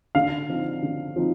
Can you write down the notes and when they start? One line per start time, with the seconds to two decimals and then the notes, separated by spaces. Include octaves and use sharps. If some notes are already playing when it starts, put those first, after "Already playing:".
0.15 D3 F5
0.49 F3 C4 D#4
0.83 D3
1.16 F3 C4 D#4